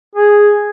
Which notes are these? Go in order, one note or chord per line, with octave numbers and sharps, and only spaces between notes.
G#4